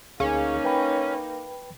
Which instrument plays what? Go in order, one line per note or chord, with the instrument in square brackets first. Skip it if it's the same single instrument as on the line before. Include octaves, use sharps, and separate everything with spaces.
[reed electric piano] D2 G#4 F5 [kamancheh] A#3 D#4 [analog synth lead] C#4
[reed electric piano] B4 G5 B5